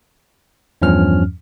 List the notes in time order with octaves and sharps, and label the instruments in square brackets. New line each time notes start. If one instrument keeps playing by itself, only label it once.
[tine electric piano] E2 G2 F3 C#4 F6